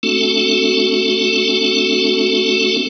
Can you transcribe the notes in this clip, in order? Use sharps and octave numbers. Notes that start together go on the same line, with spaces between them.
A3 C4 D4 F#4 A4